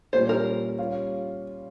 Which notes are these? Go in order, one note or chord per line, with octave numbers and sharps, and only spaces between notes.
A#2 G3 C#4 C5
A#4
G3 C#4 F4